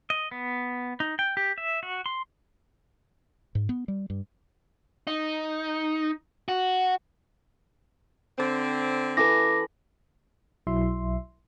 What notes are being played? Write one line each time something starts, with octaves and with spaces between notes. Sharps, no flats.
D#5
B3
D#4
G5
G4
E5
F#4
C6
G#2
B3
G3
G2
D#4
F#4
D3 C4
E3 A4 B4 D6 A#6
B1 F#3 E4 E5 C6